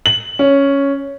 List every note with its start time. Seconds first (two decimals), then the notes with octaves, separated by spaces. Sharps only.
0.06 F#7
0.39 C#4